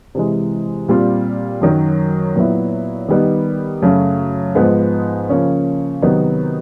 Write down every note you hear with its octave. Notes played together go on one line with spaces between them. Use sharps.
C3 E3 G#3
A#2 G3 C4 F4
F#2 D#3 F#3
A#2 F#3 B3 E4
D#3 G3 B3 D#4
F#2 C#3 F#3 A3 C#4
G#2 F3 G#3 B3 D#4
C#3 F3 A#3 C#4
C3 D#3 F#3 B3 D#4